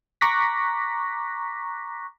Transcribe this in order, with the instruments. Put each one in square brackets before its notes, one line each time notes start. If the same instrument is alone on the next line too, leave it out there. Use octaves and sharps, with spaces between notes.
[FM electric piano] A#5 C#6 D6 F#6 A#6 B6